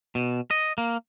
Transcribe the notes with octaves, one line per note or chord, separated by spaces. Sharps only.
B2
D#5
A#3